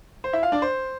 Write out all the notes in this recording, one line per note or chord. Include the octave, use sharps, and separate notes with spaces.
C5
E4 E5
F4 F5
D4 D5
C5